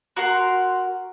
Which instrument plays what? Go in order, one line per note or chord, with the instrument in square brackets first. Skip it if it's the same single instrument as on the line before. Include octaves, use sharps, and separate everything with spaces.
[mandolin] F#4 A#4 F#5 C6